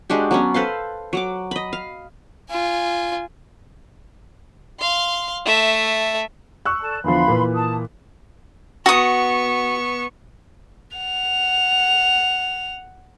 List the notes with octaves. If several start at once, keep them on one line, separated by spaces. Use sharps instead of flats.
G#3 D4 F#4 G4
F#3 B3 C#4
A4 B4 C5 F5
F#3 F#5 D6
D#5 B5
F5
F4 G#5
F5 C6
A3 E5
C#6 E6 F#6
A4 D5 A5
E2 D3 F3 F5 B5 C6
A#2 E3 B4
A5 D#6
B3 F#4 C#6 D#6
F#5 F7